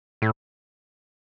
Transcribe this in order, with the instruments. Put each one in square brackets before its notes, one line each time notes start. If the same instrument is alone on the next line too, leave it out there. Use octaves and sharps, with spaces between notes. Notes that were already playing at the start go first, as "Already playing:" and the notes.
[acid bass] A2